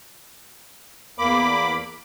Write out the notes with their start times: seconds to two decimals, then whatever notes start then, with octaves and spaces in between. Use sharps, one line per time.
1.19 E2 A#3 B5 D6